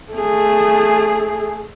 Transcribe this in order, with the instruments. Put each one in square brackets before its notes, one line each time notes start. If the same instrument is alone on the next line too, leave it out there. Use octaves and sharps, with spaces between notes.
[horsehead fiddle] A3 G#4